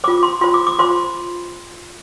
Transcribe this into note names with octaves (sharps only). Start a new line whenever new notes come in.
F4 C5 D6
C6
F4 C5 C6
D6
D6
F4 C5 C6